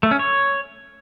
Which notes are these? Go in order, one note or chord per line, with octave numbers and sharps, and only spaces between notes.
A3
C#4
C#5